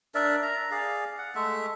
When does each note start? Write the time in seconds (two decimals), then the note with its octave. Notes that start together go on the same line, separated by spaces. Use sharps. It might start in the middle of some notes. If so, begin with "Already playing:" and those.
0.15 D4 A#4 D5 E5
0.42 A#5
0.71 G#4 D5 F5
1.18 F#5
1.35 G#3 A3 E5